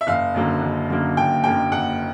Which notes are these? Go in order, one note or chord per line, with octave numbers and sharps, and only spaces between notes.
E5
F#1 F5
F#2 D3 F#3 A#3
F#1
F#2 D3 F#3 A#3
F#1 G5
F#2 D3 F#3 A#3 G5
F#1 F#5